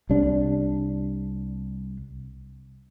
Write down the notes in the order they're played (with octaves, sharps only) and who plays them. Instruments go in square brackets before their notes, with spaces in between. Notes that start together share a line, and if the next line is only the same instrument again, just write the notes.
[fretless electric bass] C2 C3 D4